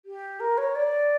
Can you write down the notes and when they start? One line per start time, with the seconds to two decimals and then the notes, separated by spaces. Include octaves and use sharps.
0.05 G4
0.40 A#4
0.57 C#5
0.75 D5